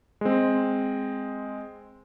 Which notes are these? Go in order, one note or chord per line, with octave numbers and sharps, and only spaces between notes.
G#3 C4